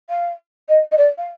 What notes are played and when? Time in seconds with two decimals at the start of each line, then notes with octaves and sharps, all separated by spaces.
0.10 F5
0.69 D#5
0.91 D#5
0.97 D5
1.18 F5